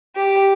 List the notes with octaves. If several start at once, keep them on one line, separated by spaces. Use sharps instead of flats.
G4